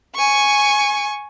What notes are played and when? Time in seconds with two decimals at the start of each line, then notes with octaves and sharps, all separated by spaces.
0.15 G#5 C#6